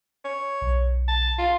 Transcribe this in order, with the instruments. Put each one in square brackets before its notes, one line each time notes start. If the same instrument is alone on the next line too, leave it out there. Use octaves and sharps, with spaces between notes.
[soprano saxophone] C#5
[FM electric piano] B1
[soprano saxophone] A5
F4